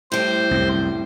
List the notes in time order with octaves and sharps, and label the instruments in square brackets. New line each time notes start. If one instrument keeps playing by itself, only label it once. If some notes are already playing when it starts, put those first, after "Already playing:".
[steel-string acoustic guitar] A2 G3 [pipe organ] C5
[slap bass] C2 F#2